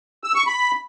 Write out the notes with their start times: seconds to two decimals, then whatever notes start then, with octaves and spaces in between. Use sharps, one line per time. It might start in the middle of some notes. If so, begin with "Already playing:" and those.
0.24 E6
0.35 C#6
0.47 B5